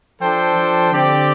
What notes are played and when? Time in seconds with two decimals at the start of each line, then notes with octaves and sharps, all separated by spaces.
0.20 F3 D4 A4 C5 G5
0.55 F3
0.92 D3 C4 G4 D5 G5